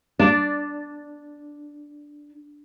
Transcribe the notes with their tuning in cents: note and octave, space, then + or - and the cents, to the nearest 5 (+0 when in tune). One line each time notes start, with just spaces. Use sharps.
D4 +0 D5 -10